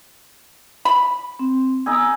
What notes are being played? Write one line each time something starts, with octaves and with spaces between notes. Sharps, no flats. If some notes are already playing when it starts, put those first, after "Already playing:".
B5
C4
B3 D#4 G#4 E6